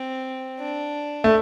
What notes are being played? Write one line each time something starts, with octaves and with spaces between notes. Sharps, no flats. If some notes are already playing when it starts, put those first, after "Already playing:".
Already playing: C4
D4
A3